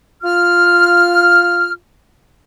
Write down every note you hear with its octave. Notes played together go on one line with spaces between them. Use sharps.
F4 F6